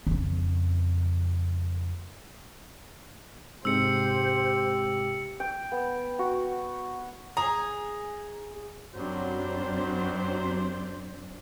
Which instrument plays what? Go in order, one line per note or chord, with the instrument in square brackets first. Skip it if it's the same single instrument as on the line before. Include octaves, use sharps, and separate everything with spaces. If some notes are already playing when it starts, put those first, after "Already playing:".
[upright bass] F2 C#3
[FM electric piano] G#2 C3 G#3 [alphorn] G4 [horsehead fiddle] C5 [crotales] E6 C#7
[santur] G5
B3
F#4
[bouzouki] G#4 [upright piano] A#5
[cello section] F#2 C4 D4 [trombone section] F#3 G3 [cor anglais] C5